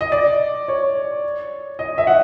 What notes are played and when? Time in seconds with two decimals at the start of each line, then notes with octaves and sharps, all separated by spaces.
0.01 D#5
0.12 D5
0.68 C#5
1.79 D#5
1.98 E5
2.07 F#5